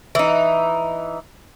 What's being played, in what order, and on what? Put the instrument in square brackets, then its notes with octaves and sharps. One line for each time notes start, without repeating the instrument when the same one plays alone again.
[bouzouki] E3 D#4